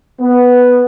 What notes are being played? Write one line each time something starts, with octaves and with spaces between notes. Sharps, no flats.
B3